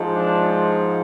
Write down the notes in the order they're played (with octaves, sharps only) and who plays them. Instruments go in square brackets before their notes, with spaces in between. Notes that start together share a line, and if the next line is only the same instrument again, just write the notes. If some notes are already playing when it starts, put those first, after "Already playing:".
Already playing: [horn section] G#2 F3 G#3
D4